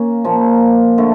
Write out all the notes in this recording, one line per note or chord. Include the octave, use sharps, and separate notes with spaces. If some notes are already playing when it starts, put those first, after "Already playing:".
Already playing: A#3 C#4
A#2 F3 A#3
D3 A3